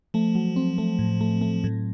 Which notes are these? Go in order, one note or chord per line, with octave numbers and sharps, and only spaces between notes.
F3 A3
F#3
C4
A3
A2
A3
A3
A2